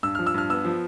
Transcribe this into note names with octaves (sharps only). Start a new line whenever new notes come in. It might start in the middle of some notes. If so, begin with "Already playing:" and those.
G2 E6
F3 F6
E6
G2 F6
B3 E6
F3